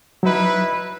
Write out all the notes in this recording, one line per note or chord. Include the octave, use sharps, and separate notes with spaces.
F#3 D#4 E4 B4